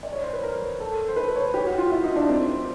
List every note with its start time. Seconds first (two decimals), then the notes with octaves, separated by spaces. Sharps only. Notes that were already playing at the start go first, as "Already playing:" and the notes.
0.03 D5
0.13 C#5
0.23 C5
0.33 B4
0.43 A#4
0.80 A4
1.08 C5
1.16 B4
1.36 C#5
1.54 G4
1.66 F#4
1.78 F4
1.91 E4
2.04 D#4
2.16 D4
2.28 C4